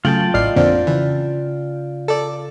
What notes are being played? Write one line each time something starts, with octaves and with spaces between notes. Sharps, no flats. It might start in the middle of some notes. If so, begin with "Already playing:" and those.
C#3 F#3 A3 F4 G5 A5 F#7
A1 A2 D5 D#5 F6 C7
F2 A#2 D3 C4 D5
C#3 E3
A4 D5